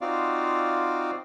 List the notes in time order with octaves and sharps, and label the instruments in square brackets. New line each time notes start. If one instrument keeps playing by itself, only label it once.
[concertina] C4 D#4 F4 F#4 D5 F5